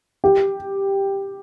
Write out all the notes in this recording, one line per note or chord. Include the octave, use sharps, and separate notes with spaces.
G4